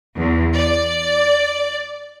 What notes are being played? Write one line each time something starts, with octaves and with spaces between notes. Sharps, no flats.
E2
D5